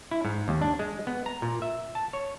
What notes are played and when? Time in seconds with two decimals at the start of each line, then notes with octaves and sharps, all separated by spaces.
0.11 E4
0.25 G#2
0.48 D#2
0.61 D4
0.79 G#3
1.07 B3
1.26 A#5
1.42 A#2
1.62 E5
1.95 A5
2.13 C#5